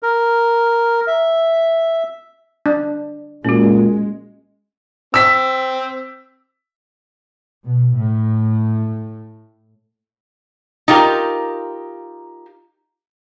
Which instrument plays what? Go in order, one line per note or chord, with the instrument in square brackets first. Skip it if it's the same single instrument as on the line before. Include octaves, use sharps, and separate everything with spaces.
[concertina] A#4
E5
[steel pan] D4
[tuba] A#2 [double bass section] G#3 [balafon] C#4 F#4
[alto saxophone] C4 [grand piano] E6 B6
[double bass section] B2
A2
[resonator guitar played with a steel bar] D#4 F4 G4 A#4